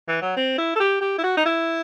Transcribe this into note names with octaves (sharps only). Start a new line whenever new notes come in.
E3
F#3
C4
E4
A4
G4
G4
E4
F#4
D#4
E4